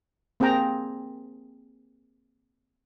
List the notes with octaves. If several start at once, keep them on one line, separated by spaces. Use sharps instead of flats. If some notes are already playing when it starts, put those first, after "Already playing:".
A#3 C4 G#4 G5 A#5